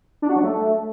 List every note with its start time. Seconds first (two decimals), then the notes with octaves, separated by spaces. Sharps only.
0.22 D4
0.29 F#4
0.36 F#3
0.43 A3